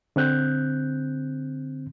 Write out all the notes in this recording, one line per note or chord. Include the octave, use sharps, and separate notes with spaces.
D3 C4 F#6 G6